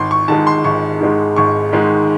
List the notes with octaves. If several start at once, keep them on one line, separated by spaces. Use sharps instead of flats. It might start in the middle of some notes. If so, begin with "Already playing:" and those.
Already playing: G#1 C6
C#6
G#2 D#3 G#3 A5
C6
G#1 C#6
G#2 D#3 G#3
G#1 C#6
G#2 D#3 G#3